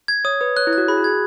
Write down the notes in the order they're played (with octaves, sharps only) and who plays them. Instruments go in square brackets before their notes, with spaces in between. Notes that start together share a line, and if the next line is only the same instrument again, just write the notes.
[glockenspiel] G#6
[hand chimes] C#5 [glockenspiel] D#6
[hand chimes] B4 [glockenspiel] D#6
[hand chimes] C#5 [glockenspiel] F#6
[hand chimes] E4
[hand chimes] F#4 [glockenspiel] F#6
[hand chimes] G#4 [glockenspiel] B5
[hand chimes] F#4
[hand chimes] G#4 [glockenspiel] G#6